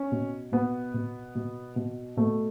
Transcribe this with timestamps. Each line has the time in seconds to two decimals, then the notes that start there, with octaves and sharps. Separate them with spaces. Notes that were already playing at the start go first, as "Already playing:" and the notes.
Already playing: C#4
0.12 B2
0.52 B2 B3
0.94 B2
1.35 B2
1.76 B2
2.17 B2 A3